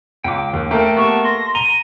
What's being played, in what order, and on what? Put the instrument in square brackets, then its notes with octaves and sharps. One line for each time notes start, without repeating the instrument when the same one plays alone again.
[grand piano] C#2 [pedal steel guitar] G5 D6
[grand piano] D#2
[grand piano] A3 A#3 A4 [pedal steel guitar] G5
[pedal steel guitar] B3 G4 A5 [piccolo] C#6
[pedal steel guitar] C6 [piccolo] A#6
[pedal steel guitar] A#5 [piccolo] D#7 [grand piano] G7